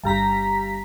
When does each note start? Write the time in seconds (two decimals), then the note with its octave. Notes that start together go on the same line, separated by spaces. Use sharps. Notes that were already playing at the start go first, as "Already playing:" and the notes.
0.03 G1 G2 A#5 B6